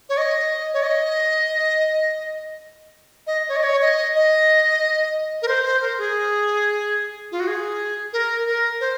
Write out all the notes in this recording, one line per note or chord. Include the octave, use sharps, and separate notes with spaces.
C#5
D#5
C#5
D#5
D#5
C#5
D#5
C#5
D#5
D#5
A#4
C5
C5
A#4
G#4
F4
F#4
G#4
A#4
A#4
C5